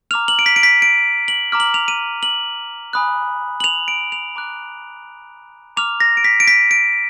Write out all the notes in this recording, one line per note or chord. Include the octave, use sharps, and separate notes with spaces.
A#5 D6 F6 F7
F#7
D7
B6
D7
B6
D7
F#7
A#5 D6 F6
F#7
F7
D#7
F#7
G#5 B5 D#6 F#6
F#7
F7
D7
F7
A#5 D6 F#6
A#5 D6 F6 F7
A#6
D7
B6
D7
B6
D7